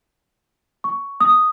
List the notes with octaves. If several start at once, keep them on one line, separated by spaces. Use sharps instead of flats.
C#6
D#6